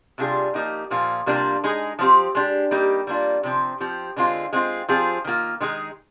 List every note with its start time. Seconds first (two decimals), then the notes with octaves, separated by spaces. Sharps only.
0.18 C3 G3 D4 F4 G#4
0.54 F3 A#3 D#4 G4
0.90 A#2 F3 A#3 F4
1.26 C3 G3 A#3 D4 F4
1.64 G#3 D#4 G#4
1.99 F3 C4 G4
2.35 G#3 D4 G4
2.71 G3 A#3 D#4 G4
3.07 G3 A#3 D4 F4
3.43 C3 F3 C4
3.81 F3 C4 G4
4.16 D3 G#3 C4 F4
4.53 G#3 C4 F4
4.89 F3 C4 F4 G#4
5.24 D#3 A#3 F4
5.60 D#3 G#3 D#4 G#4